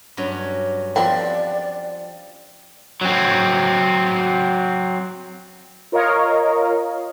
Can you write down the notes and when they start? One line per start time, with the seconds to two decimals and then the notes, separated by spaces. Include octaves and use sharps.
0.17 G2 F#3 C#4
0.96 F3 B3 C4 F4 D5 F5 G5
3.01 F#3 C4
5.92 F4 A#4 C#5 D#5 F5